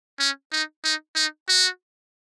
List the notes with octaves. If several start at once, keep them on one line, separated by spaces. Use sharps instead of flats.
C#4
D#4
D#4
D#4
F#4